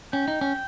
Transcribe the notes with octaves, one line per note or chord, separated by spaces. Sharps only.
C#4 G5
D#4
C#4